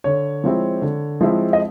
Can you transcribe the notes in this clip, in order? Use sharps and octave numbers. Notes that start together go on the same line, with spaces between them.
D3 C#5
F3 G#3 C4 E4
D3
F3 G#3 C4 E4
D#5